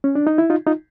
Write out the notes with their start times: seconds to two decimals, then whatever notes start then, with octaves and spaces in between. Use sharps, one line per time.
0.04 C#4
0.15 D4
0.27 D#4
0.38 E4
0.50 D#4 F4
0.66 D#4 F4